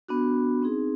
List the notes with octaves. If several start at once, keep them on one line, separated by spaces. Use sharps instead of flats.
B3 D4 F#4
C4 D#4 G#4